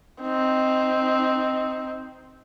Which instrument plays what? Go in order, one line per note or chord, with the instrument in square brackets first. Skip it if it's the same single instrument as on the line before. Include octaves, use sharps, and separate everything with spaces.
[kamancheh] C4 D#4